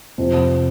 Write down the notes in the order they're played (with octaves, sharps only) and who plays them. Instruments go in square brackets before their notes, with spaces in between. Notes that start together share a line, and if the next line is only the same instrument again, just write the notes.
[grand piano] F2 C3 F3 C4